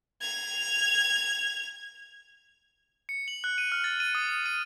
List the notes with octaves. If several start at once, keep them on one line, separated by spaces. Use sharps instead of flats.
G#6 F7
C#7
F#7
F#6
D#7
F6
A6
D#7
D#6
D#7
D#7